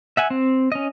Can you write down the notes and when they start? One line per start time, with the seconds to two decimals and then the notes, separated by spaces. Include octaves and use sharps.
0.17 E5 F#5 G#5
0.30 C4
0.72 C#4 D#5